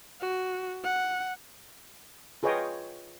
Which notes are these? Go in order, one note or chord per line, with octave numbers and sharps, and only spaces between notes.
F#4
F#5
F4 G#4 B4 C#5 D#5 G5